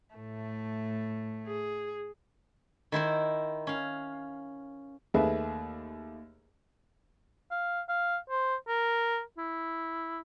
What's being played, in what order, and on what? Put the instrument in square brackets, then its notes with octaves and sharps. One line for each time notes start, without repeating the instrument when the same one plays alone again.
[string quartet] A2 A3
[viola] G#4
[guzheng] D#3 E4 C5 C6
C#4 F5
[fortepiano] D#2 A3 G#4 B4 E5
[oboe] F5
F5
C5
A#4
E4